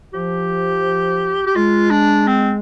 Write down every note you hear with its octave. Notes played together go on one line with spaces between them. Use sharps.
F3 G4
G4
G#3 F4
D4
C4